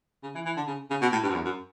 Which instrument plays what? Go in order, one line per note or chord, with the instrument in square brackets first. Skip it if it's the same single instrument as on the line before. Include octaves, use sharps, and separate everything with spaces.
[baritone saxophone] C#3
E3
E3
D3
C#3
C#3
B2
A2
G2
F#2
E2
F#2